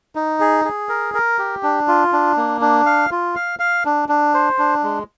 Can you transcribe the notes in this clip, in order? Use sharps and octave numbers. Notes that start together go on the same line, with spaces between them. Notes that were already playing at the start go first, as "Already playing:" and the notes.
D#4
G#4
G#4
A#4
A#4
G4
D4
F4
D4
A#3
D4
F5
F4
F5
F5
D4
D4
C5
D4
G#3